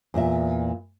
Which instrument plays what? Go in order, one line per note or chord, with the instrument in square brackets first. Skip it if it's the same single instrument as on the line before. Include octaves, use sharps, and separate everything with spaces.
[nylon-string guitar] E2 A#2 E5